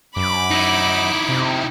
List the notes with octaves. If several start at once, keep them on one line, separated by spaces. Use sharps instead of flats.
F#2 B5 D6
D#4 E4
C3